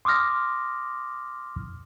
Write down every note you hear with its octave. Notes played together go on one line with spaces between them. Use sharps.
C6 D6 D#6 F6 A#6